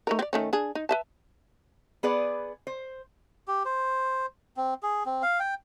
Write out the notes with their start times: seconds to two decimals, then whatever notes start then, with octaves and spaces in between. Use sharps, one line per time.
0.07 A3 D#4 A#4
0.19 C4 D5
0.33 D#3 A3 C#4
0.53 D4 G#4
0.75 D#4
0.89 B4 E5 A5
2.03 B3 G#4 B4 D5
2.67 C5
3.48 G4
3.65 C5
4.57 C4
4.83 G#4
5.06 C4
5.23 F5
5.40 G5